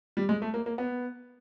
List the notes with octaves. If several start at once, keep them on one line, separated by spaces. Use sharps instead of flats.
G3
G#3
A3
A#3
A#3
B3